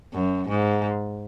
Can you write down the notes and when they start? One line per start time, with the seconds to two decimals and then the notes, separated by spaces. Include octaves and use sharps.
0.14 F#2
0.49 G#2